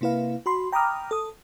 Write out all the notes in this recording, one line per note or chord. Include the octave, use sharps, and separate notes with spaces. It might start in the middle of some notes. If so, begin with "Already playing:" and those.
C3 A#3 E4 B4 F5
F#4 B5 C6
G5 A#5 B5 D6 D#6 F6
A4 D#6